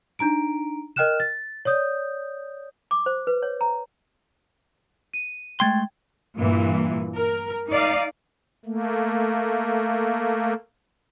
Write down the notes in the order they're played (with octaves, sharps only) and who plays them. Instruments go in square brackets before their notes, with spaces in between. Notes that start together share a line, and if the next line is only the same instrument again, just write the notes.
[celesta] D4 D#4 A#5 D7
A#4 D#5 G5 F6 F#6 E7
A6
C#5 D5 D#6 G6
[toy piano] D6
C5
B4
C#5
A#5
[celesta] D#7
[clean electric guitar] G#3 A3 C6 [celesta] G5 G#6 A6
[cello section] G2 A#2 E3
A#4
D#4 D5 F5
[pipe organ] A3 A#3